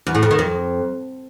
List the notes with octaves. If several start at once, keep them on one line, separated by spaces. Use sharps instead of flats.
E2
A2
F2
D#3
F2